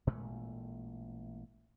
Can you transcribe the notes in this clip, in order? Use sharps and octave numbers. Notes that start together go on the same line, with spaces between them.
A1 A#2 G#3 A3